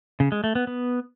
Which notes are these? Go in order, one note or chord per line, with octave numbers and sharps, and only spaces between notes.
C#3
G#3
A3
B3
B3